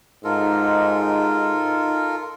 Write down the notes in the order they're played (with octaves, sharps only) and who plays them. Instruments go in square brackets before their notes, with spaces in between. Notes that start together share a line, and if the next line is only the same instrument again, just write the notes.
[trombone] G#2 [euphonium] D#4 [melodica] F4 A4 A#4